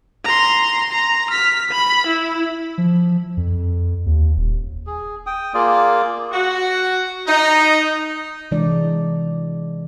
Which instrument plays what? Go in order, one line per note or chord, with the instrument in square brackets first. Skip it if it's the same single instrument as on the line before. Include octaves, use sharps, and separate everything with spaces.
[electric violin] A#5 C6
A#5
F6 B6
B5
E4
[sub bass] F3
F2
D#2
D#1
[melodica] G#4
G5 D#6
A#3 F4 G#4 D5
[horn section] F#4
D#4
[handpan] C3 E3 G#3 D4 D5